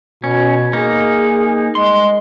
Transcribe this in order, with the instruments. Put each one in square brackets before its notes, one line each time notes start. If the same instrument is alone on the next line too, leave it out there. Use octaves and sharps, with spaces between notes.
[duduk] B2 [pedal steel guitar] C#4
[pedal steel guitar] A#3 D#4 [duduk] G#4
[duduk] G#3 [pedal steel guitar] C6